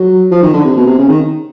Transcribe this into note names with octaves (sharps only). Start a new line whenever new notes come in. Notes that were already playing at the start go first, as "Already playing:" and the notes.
Already playing: F#3
F3
D#3
D3
C3
B2
C3
C#3
D#3